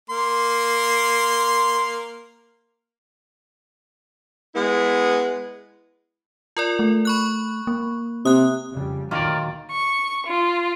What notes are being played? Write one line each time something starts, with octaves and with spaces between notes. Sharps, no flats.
A#3 C6
G#3 B3 E4
F4 A#4 D5
A3
B5 C#6 F#6
A#3
C3 D#6 F#6
F2 C#3 G3
D2 A#2 D#3 F#3 A#3 F4 A#4 D5
C#6
F4